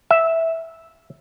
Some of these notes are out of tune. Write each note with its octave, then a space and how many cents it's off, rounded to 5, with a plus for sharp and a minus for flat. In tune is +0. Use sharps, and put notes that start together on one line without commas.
E5 -5